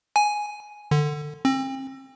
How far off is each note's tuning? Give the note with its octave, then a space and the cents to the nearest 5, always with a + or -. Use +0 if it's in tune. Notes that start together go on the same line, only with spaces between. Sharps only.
G#5 +5
D3 +20
C4 +35